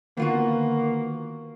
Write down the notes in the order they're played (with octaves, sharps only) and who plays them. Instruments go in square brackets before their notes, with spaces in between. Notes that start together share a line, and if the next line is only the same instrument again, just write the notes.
[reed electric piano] D3 D#3 [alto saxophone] A#3 [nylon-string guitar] B3 F4 F#4